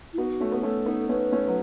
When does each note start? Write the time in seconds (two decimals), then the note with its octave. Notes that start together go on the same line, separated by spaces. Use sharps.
0.13 E4
0.17 B3 D#4 F#4
0.40 A3 C#4
0.52 B3
0.63 A3 C#4 A4
0.86 B3 D#4
1.09 A3 C#4 B4
1.32 A3 C#4
1.48 F#3